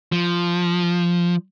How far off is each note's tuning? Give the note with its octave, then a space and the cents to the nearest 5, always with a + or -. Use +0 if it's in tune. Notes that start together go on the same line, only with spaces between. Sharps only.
F3 -5